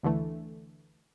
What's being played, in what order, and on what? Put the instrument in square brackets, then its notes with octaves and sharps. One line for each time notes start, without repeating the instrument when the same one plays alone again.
[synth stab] D2 D3 E3 A3